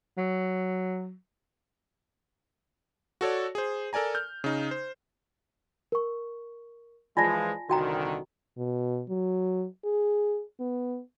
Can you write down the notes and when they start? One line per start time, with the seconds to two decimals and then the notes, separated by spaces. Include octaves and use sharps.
0.18 F#3
3.21 F#4 A4 C#5 D5
3.55 G#4 C5
3.93 A4 A#4 D5 G#5 A#5
4.15 F6 G6
4.44 C#3 D#4
4.71 C5
5.92 A#4 C#6
7.17 E3 F3 G#3 F4 D5 G#5 A5 A#6
7.70 C2 D3 D#3 F#4 G5 A#5
8.58 B2
9.09 F#3
9.85 G#4
10.60 B3